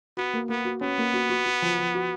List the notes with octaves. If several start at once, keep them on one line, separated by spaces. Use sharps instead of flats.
B3 F#4
A#3
A#3 B3
F#4
B3 C#4
A#3
F#4
F#4
F#4
F3
F3
F#4